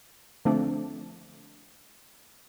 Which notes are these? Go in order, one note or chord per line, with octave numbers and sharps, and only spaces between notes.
D3 F3 A3 C4 D4